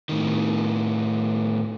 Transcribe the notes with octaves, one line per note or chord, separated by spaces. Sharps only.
A2 D#3